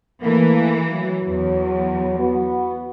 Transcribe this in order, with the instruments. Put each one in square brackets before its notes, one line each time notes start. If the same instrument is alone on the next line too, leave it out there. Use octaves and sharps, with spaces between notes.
[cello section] E3 [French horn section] A3 A#3
[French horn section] F#3
[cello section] E2
[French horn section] B3 F#4